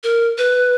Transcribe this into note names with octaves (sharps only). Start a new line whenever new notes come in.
A#4
B4